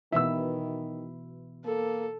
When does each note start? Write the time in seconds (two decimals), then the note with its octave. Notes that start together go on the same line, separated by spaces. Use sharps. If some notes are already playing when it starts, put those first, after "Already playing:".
0.12 B2 D#3 E3 E4 E5 E6
1.65 A#3 A4